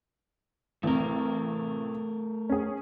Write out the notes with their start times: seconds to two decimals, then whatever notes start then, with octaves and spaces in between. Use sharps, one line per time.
0.83 A1 C3 A3 A#4
2.50 C#4 G#4